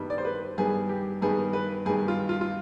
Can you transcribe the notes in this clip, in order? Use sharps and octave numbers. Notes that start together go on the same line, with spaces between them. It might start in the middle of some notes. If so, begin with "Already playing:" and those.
Already playing: G2 D#3 G3 B3
D5
C5
B4
G2 D#3 G3 B3 G#4
G4
G2 D#3 G3 B3 G#4
B4
G2 D#3 G3 B3 G#4
F4
F4
F4